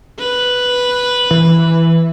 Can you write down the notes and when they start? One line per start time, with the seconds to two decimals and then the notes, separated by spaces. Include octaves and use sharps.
0.19 B4
1.31 E3